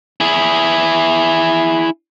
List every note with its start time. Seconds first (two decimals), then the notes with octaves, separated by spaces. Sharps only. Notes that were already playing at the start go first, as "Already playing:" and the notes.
0.20 E4 G#4